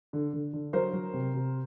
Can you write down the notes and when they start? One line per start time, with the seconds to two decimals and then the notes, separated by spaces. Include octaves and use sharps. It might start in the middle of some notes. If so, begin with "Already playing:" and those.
0.13 D3
0.33 D3
0.53 D3
0.73 F#3 A#4 C5
0.93 F#3
1.14 C3
1.34 C3